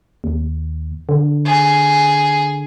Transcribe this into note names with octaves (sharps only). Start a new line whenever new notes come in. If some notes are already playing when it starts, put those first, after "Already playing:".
D#2
D3
G#4